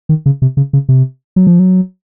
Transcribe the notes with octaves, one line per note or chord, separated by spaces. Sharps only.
D#3
C#3
C3
C#3
C#3
C3
F#3
F3
F#3